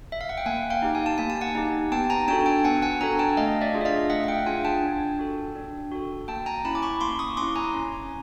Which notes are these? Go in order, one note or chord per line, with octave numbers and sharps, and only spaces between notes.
E5
F5
F#5
G5
A#3 F#5 G#5
F5 G5
D#4 G4
G#5
A5
A#3 G#5
A5
F#5 G#5
D#4 G4
B3 G5 A5
G#5 A#5
D4 F#4 A4 G5 A5
G5 A5
B3 F#5 G#5
F#5 G#5
D4 F#4 A4 G#5 A#5
G5 A5
A3 D#5 F5
D5 E5
D4 F4 G#4
E5
D#5 F5
A3 E5 F#5
F#5
F5 G5
D4 F4 G#4 F#5 G#5
G5 A5
D4
F#4 A4
D4
F#4 A4
A#3 G5 A5
G#5 A#5
C#4 E4 A5 B5
D6
B5 C#6
A#3 C6 D6
C#6 D#6
C#4 E4 C6 D6
G#5 A#5
C#4